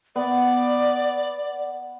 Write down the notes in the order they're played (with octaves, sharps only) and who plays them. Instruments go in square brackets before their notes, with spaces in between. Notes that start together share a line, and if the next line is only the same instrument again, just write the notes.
[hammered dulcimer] B3 [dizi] D5